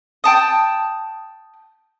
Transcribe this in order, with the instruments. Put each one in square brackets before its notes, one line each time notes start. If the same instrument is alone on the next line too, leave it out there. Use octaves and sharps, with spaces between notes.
[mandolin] G5 A5 D#6